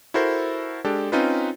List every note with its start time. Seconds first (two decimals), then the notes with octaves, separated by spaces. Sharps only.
0.14 E4 F#4 A4 A#4 C5
0.85 G#3 D4 G4 A4
1.12 C4 C#4 D#4 F4 B4